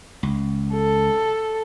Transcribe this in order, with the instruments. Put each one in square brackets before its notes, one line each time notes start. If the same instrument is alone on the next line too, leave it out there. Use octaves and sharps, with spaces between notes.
[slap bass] C#2
[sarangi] A4